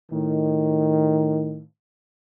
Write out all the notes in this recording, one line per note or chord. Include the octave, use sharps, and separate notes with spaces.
A2 D#3